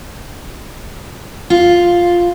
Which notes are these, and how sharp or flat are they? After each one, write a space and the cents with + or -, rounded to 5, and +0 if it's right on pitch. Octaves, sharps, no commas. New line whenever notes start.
F4 +0